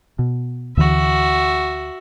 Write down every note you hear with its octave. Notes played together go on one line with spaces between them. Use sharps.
B2
D2 D3 E3 F#4 E5